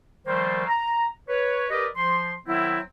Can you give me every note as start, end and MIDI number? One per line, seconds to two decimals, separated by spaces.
0.26 0.64 51
0.26 0.64 53
0.26 0.64 55
0.26 0.64 57
0.26 0.64 58
0.26 0.64 72
0.67 1.07 82
1.28 1.69 71
1.28 1.69 73
1.71 1.86 67
1.71 1.86 70
1.71 1.86 71
1.71 1.86 74
1.71 1.86 75
1.96 2.34 53
1.96 2.34 84
2.47 2.79 51
2.47 2.79 54
2.47 2.79 59
2.47 2.79 60
2.47 2.79 64